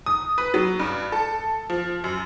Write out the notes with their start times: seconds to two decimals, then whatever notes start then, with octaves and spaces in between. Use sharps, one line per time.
0.06 D#6
0.38 B4
0.54 F#3
0.80 G2
1.12 A4
1.70 F3
2.04 F#2